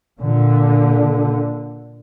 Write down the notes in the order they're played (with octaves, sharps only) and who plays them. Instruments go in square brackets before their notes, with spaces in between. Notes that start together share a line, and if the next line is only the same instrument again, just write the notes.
[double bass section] A#2 D3